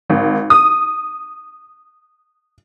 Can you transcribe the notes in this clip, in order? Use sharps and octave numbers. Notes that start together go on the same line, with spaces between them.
G#1
D#6